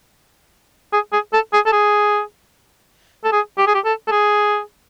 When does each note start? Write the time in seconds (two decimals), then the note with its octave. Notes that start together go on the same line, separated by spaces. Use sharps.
0.93 G#4
1.13 G#4
1.33 A4
1.53 G#4
1.66 A4
1.72 G#4
3.24 A4
3.32 G#4
3.58 G4
3.67 G#4
3.74 G4
3.85 A4
4.07 A4
4.11 G#4